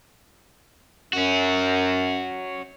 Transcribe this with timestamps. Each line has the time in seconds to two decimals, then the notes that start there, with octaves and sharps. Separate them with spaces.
1.13 F#2 C#4 F#4